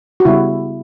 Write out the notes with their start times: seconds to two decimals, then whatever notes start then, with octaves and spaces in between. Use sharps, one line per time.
0.20 F#4
0.25 C#3 G3 B3 E4